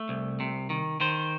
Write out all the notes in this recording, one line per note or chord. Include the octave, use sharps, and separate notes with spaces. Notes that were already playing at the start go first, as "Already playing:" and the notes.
Already playing: A3
C2
C3
D#3
D#3 C5